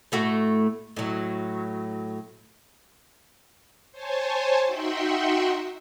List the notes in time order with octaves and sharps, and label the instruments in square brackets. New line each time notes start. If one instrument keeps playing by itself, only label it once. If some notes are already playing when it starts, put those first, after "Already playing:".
[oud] A2 A3 F#4
A2 F#3
[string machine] C5 C#5 G#5 A5
D#4 F#4 E5 F#5 G5 C6